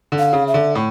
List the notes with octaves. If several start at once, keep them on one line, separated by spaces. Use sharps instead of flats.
D3
F5
C#3
E5
D3
A2